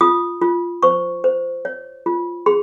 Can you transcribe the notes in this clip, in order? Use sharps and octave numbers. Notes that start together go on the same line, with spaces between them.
F4 D#6
F4
C5 C#6
C5
C#5
F4
G#4 C6